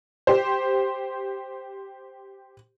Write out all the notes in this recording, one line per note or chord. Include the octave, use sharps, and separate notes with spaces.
G4 C5